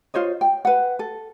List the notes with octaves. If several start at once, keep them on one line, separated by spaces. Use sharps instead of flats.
F4 C5 C#5 D#5
G5
B4 F#5
A4